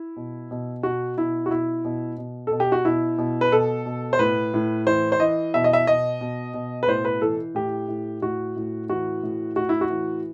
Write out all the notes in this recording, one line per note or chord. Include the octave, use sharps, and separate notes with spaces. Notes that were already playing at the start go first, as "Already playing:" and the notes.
Already playing: E4
B2
B2
B2 F#4
B2 E4
F#4
B2 E4
B2
B2
B2 A4
G4
F#4
B2 E4
B2
B4
B2 A4
B2
C5
A2 B4
A2
E3 C5
C5
E3 D#5
B2 E5
D#5
E5
B2 D#5
B2
B2
B4
A2 C5
B4
E3 A4
A2 G4
A2
A2 F#4
A2
E3 F#4
A2
A2 F#4
E4
F#4
E3